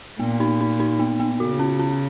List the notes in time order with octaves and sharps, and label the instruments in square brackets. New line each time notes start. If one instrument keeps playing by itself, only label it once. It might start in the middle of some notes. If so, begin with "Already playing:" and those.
[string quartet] A#2 [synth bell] B3
[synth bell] D#4
D#4
D#4
B3
B3
[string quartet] C#3 [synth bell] F#4
[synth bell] C#4
C#4